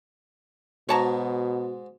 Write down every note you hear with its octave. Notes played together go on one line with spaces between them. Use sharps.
G#2 B2 G#3 F#4 C#5 A5 A#5